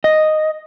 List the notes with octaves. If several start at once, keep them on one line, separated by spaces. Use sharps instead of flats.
D#5